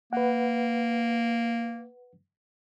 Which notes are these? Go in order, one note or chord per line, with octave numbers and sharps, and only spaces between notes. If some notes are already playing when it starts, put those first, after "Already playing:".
A#3 B4 F#5